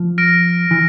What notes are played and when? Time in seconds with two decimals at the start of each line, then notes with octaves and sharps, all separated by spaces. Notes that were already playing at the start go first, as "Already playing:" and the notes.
Already playing: F3
0.18 F6 A#6 D7
0.71 E3